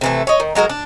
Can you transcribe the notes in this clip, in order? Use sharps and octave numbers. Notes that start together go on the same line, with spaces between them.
C3 E3 A3
C#5 D#5
D#3
F#3 G#3 F#4 A#4
D4